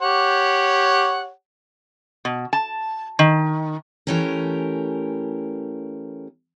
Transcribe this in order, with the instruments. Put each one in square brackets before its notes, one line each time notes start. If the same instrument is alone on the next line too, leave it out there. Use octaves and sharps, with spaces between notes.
[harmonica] G4 C#5 F#5
[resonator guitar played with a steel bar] B2
A5
D#3
[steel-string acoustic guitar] E3 A3 C#4 G4 A#4